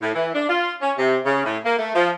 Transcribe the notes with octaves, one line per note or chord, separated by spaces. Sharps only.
A2
E3
D4
F4
C#4
C3
C#3
A2
A#3
A3
F3